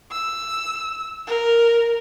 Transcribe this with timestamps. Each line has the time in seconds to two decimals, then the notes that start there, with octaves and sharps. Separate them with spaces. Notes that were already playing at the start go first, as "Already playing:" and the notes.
0.12 E6
1.27 A#4